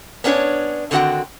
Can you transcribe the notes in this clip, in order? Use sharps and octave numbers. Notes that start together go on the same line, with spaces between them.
B3 C#4 D4 G4 C#5
D3 D#3 C4 F#4 F#5 G5